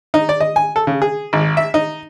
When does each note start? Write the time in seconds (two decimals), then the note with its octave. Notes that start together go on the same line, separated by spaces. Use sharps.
0.14 D#4
0.29 D5
0.40 D#5
0.56 G#5
0.76 A4
0.87 C#3
1.02 G#4
1.33 G#1
1.57 E5
1.74 D#4